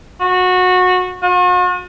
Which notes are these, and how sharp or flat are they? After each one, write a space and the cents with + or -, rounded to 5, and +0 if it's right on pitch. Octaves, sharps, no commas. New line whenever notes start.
F#4 -20
F#4 -45